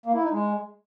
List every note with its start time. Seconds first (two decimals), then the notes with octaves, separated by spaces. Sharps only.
0.06 A#3
0.14 E4
0.23 D#4
0.32 G#3